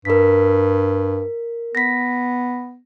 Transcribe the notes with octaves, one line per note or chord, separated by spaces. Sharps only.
G2 A#4 B6
B3 A#6 B6